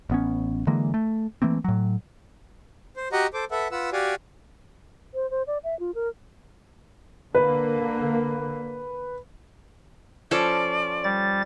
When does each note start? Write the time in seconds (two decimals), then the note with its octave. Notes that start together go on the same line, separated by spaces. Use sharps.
0.10 A1 B3 C#4
0.67 D3 E3 G#3 A#3
0.94 A3
1.42 E3 A3 A#3 C4
1.64 A2 F#3
2.97 C5
3.12 F#4 G4 D#5 F#5 A#5
3.34 A4 C5 D6
3.51 A4 B4 E5 F#5
3.72 F4 B4 F#5 E6
3.93 F#4 G4 D5 F5 F#5 G#5
5.14 C5
5.31 C5
5.47 D5
5.64 E5
5.80 F4
5.95 A#4
7.35 D3 A#3 B4
10.31 F3 C#4 A4 D5
11.04 G3 A6